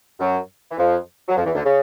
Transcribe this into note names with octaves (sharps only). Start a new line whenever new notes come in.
F#2 F#3
E3
F2 F3
F#3
F2 F3
E2 E3
D2 D3
C#3